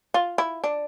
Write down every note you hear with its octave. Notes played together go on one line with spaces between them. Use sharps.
F4
E4
D4